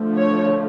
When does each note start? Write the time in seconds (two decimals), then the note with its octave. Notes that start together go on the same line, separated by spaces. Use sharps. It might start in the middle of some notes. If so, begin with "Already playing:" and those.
Already playing: D3 F3 A3
0.17 C#5